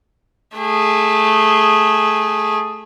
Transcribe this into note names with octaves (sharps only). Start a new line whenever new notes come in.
A3 G#4